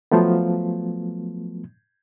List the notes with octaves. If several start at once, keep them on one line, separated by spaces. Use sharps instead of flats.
F3 F#3 A3 B3